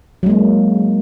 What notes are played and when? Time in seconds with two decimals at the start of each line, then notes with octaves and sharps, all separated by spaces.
0.23 F#3
0.26 G#3
0.30 A#3